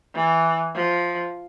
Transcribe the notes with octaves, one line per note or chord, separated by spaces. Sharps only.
E3
F3